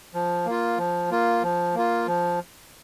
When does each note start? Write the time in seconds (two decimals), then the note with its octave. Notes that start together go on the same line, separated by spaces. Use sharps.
0.14 F3
0.46 A#3 F4
0.78 F3
1.11 A#3 F4
1.43 F3
1.75 A#3 F4
2.07 F3